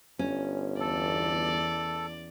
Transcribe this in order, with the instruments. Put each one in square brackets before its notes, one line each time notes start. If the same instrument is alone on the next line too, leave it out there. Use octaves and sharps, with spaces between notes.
[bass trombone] G1 [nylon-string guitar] C#4
[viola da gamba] E2 D5 [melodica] A4